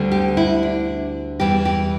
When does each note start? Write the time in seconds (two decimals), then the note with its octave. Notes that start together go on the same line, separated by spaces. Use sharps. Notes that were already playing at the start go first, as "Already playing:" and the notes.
Already playing: D2 D3 G3
0.12 G4
0.37 E4
0.63 D4
1.40 E2 E3 G3 G4
1.65 G4